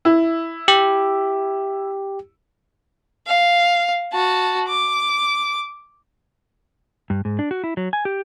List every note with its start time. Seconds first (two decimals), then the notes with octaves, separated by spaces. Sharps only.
0.05 E4
0.68 G4
3.27 F5
4.12 F#4 A5
4.68 D6
7.10 G2
7.25 G#2
7.39 D4
7.51 F#4
7.64 E4
7.77 F#3
7.93 G#5
8.05 G4